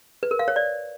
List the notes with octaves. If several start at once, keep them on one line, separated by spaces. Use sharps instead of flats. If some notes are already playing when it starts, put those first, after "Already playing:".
B4
A#4
F5
C#5
D5